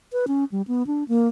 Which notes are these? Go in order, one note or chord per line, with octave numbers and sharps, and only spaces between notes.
B4
C#4
G3
B3
D4
A#3